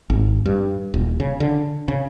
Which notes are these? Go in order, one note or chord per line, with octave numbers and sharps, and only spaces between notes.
G#1
G2
D#1
C#3
D3
C#3